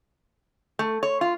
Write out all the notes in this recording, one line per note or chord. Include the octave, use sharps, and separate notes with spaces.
A3
C#5
F4